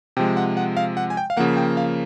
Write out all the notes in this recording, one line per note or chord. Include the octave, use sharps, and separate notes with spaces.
C3 F3 G#3 G5
F#5
F#5
F5
F#5
G#5
G5
F5
C#3 F3 A#3 F#5
G5
F5